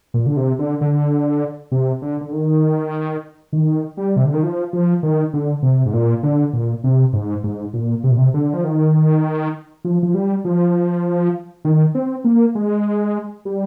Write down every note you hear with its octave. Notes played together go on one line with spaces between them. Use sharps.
A#2
D3
C3
D3
D3
C3
D3
D3
D#3
D#3
G3
C3
D3
D#3
F3
F3
D#3
D3
C3
G#2
A#2
D3
A#2
C3
G#2
G#2
A#2
C3
A#2
C3
D3
F3
D#3
F3
F3
G3
F3
D#3
C4
A#3
G#3
G3